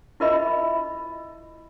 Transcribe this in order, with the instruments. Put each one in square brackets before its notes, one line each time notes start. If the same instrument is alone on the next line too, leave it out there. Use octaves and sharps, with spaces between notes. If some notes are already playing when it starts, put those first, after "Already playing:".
[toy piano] E4 F4 A#4 D#5 E5 B5